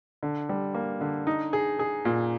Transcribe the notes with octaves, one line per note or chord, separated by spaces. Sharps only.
D3
G3
A#3
D3
D#4
G#4
G#4
A#2